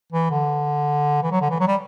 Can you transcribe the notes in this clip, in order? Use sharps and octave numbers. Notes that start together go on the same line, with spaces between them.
E3
D3
E3
F#3
D3
E3
F#3
G3